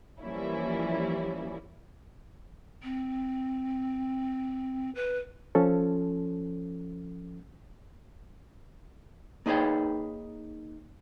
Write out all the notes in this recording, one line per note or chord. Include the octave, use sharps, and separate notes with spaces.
E3 F3 G3 A#3 C#4 E4
C4
B4
F3 C#4 A4
A#3 D#4 G#4 B4 C#5 G5